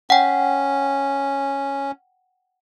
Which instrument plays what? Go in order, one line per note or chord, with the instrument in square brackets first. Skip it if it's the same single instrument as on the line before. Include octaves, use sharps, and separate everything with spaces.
[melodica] C#4 [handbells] F#5 G5